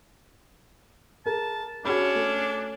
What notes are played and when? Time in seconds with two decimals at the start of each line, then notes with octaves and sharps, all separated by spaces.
1.26 G#4 A#4 A5
1.85 C#4 D4 F#4 G#4 B5
2.15 A3